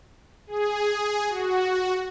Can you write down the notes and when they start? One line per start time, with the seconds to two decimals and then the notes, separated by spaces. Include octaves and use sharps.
0.47 G#4
1.28 F#4